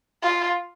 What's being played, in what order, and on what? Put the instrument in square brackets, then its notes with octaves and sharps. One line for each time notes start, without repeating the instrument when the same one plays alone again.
[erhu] F4